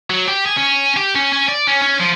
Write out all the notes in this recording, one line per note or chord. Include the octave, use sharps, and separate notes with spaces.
F#3
G4
G#4
C#4
G4
C#4
C#4
D5
C#4
C#4
F3